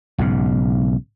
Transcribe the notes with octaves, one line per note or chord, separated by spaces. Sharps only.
B1 G#2 C#3